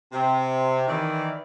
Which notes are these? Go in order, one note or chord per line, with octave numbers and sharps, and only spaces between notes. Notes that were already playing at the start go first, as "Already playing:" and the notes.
C3
D#3 E3 D5